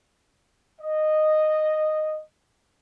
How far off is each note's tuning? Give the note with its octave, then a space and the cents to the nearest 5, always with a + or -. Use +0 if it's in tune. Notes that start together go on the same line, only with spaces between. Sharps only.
D#5 -10